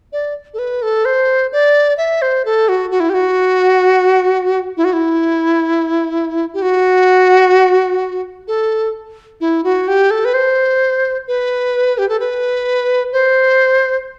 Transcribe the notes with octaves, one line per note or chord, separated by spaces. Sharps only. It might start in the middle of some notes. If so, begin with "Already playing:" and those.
D5
A4
B4
A4
C5
D5
E5
C5
A4
F#4
F#4
E4
G4
F#4
E4
F#4
E4
G4
F#4
A4
E4
F#4
G4
A4
B4
C5
B4
G4
A4
B4
C5